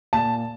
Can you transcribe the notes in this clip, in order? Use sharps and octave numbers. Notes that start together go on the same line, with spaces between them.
A#2 A5